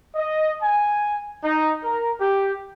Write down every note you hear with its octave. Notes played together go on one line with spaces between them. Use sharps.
D#5
G#5
D#4
A#4
G4